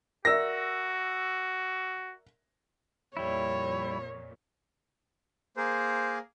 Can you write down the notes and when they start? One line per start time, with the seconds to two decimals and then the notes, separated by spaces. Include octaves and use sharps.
0.25 F#4 A#4 D5 E5 E6 A#6
3.17 F2 A#2 G3 E4 C#5
5.57 A#3 G#4 A#4 C5